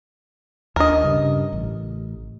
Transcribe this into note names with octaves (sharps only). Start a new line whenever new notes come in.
D#2 D4 A#4 D#5
G2 C#3
A1